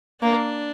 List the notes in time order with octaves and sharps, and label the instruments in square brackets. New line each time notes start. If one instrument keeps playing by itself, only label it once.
[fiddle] A#3 [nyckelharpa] D4